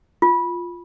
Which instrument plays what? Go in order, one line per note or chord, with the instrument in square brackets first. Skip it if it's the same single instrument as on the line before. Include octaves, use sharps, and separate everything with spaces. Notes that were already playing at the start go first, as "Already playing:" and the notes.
[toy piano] F4